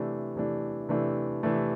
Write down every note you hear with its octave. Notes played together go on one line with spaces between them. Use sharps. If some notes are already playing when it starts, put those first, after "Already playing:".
Already playing: C3 E3 A3 D4
C3 E3 A3 D4
C3 E3 A3 D4
C3 E3 A3 D4